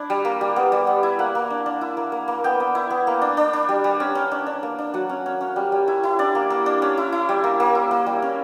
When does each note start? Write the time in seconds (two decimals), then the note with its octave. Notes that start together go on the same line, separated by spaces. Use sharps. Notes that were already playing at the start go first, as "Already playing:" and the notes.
Already playing: D4 E4
0.10 G3
0.25 A#3
0.41 G3
0.56 B3
0.72 G3
0.87 B3
1.03 E4
1.19 A#3 F#5
1.35 A#3
1.50 D4
1.66 D4
1.81 E4
1.97 A#3
2.12 A#3
2.28 A#3
2.44 B3 G5
2.60 B3
2.75 E4
2.90 B3
3.07 A#3
3.22 D4
3.37 D4
3.53 D4
3.69 G3
3.84 G3
4.00 C#4
4.15 C#4
4.31 D4
4.46 D4
4.63 A#3
4.79 D4
4.94 F#3 F#5
5.09 C#4
5.26 C#4
5.41 C#4
5.56 G3
5.72 G3
5.88 E4
6.03 E4
6.19 D4 D5
6.35 A#3
6.50 A#3
6.66 D4
6.82 C#4
6.97 E4
7.12 E4
7.29 G3
7.44 A#3
7.60 A#3
7.75 E4
7.91 A#3
8.06 G3
8.22 C#4